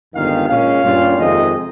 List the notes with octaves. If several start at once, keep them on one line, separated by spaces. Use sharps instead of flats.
G1 F2 D#3 G#3 F5
A#2 G#3 C#4 F5
G2 G3 A#3 C#4 F4
F2 C3 D#3 G#3 D#5